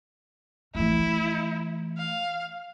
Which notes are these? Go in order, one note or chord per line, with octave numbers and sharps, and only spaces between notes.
E3 A3 E4
F5